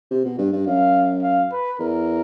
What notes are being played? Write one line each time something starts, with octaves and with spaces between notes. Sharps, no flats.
C3
B2
G2
G2
F#2 F5
F5
B4
E2 A#4